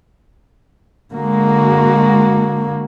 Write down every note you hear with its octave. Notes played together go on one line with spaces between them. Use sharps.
D3 G#3 A#3 F#4